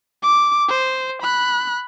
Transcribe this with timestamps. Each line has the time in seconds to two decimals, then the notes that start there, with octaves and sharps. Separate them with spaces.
0.22 D6
0.69 C5
1.22 B5 F#6